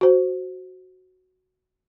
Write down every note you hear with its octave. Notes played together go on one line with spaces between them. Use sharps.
F#4 C5